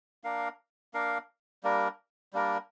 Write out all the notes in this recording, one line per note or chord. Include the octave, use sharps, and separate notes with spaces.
A#3 D4 A#4 F5
A#3 D4 A#4 F5
G3 A#3 D4 A#4
G3 A#3 D4 A#4